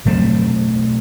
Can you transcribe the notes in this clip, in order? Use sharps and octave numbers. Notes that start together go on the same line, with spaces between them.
B2 F#3 A3 C4